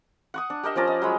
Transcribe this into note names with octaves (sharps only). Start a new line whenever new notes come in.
F#5 C#6 D#6
D4
G4 A#4 D#5 E5
F3 C#4 D5 A#5
D#5
F#3 G#3 B5